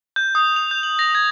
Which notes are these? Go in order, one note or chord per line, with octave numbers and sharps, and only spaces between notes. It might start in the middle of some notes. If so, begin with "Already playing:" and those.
G6
D#6
F7
G6
F#7
A#6
G#6